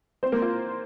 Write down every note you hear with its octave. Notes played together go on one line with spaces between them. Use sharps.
C4 C5
A#3 A#4
F4